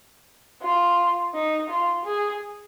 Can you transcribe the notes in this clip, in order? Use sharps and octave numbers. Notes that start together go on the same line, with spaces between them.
F4
D#4
F4
G#4